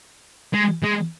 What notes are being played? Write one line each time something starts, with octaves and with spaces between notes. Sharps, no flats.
G#3
G#3